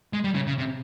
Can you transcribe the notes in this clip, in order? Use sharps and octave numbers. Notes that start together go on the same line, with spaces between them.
G#3
G3
C#3
C#3
C3